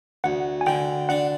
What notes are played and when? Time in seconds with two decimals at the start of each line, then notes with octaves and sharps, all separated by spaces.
0.24 D2 F#5
0.61 G#5
0.66 D3 G5
1.09 D4 F#5